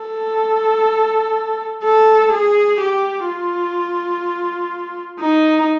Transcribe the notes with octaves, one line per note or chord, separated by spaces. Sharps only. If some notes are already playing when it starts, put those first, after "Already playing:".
Already playing: A4
A4
G#4
G4
F4
D#4